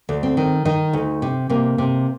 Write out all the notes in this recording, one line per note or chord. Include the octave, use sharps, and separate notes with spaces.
D2
C4
D#3
D#3 D#4
D2
C3
C3 A#3
C3